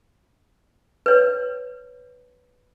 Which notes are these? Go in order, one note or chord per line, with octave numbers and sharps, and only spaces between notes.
B4 C#5